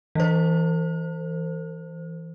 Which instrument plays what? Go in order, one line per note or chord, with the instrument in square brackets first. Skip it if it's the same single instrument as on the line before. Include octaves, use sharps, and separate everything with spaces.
[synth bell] E3 C5